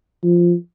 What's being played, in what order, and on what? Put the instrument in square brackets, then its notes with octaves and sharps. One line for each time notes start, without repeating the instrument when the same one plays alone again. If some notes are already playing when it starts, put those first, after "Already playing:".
[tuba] F3